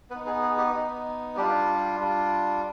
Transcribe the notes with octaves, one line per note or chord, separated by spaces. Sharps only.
B3 D#4 B4
G#4
G#4
G4
B3 D#4
G3 D4 F4 G4
G3 D4 F4